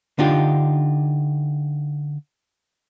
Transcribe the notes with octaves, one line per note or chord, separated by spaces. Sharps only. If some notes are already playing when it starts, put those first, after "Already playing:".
D3 D4 D#4 F4 G4